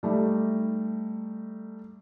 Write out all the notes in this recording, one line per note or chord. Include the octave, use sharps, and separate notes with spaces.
G3 A3 D#4